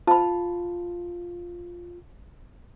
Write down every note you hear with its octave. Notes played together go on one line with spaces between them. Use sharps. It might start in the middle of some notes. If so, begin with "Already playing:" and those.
F4 A5 B5